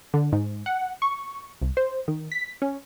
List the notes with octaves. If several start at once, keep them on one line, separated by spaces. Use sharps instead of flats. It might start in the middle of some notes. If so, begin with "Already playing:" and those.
D3
G#2
F#5
C#6
C2
C5
D#3
B6
C#4